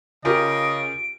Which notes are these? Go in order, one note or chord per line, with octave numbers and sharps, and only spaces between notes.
C#3 F4 G4 A#4 D#5 D7